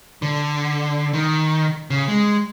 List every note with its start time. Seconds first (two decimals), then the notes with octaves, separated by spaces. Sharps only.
0.22 D3
1.13 D#3
1.90 C#3
2.08 G#3